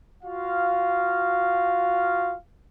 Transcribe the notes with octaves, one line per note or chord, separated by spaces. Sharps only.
F4 F#4 F5